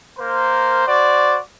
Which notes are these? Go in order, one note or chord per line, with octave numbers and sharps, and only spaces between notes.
A#3 A#4 C5
F#4 C5 D5